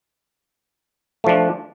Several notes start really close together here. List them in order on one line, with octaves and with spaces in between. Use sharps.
A3 F3 D4